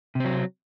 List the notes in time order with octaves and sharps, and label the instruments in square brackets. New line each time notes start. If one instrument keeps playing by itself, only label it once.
[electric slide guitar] C3
C4
F#3